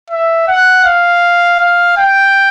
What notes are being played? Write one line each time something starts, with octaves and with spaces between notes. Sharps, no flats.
E5
F#5
F5
F5
G5